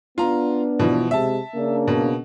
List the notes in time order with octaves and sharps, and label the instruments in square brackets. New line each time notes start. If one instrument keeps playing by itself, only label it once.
[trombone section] B3 D4 [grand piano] F4 A#5
[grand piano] B2 E3 F3
[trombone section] C3 G#3 [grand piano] E5 A5
[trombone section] C#3 A#3 D4
[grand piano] B2